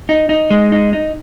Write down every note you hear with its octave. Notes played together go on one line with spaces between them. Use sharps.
D#4
D#4
G#3
D#4
D#4